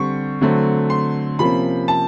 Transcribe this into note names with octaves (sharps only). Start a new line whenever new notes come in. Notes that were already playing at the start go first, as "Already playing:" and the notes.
Already playing: D3 G3 C4 C#6
D3 F#3 A3 C4
C6
C3 F3 A#3 C#4 B5
A5